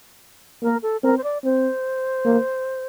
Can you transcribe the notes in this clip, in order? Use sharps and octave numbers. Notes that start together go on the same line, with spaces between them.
A#3 A#4
A4
C4 A#4
C5
D5
C4 C5
A#3